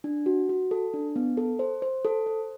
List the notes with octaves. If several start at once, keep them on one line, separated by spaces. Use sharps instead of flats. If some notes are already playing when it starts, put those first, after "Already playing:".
D4
F#4
F#4
A4
D4
B3
A4
C5
C5
A4
C5